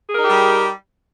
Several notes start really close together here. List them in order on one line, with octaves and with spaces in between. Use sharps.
G#4 A#4 D#4 G4 G3